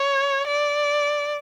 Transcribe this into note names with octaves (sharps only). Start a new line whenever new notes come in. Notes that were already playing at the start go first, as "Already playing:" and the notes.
Already playing: C#5
D5